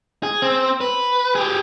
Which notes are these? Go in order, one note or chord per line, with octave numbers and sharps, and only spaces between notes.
G#4
C4
B4
G4 G#4